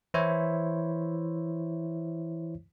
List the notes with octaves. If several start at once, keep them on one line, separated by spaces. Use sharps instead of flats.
E3 E4 C5 C#5 E5